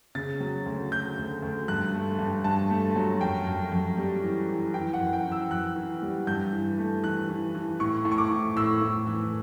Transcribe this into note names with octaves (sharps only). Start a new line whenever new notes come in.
C#3 A6
F#3
D2
D2 G6
D2
D2
G2 F#6
A3
G2
G2 A5
A3
F#3
F#2 G5
F#2
F#2
G3
E3
E3
E3 G5
F#5
F#2
G5
E3
E6
F#2 F#6
E3
G3
G2 G6
E3
A3
E3 F#6
E3
E3
A2 C#6
A2
C#6
D6
A2
A2 E6
A2
E3